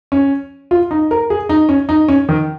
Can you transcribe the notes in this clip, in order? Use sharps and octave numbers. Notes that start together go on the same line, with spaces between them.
C#4
F4
D#4
A#4
G#4
D#4
C#4
D#4
C#4
D#3